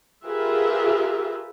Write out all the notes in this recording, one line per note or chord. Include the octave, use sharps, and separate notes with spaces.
F4 G4 G#4 A#4 B4 E5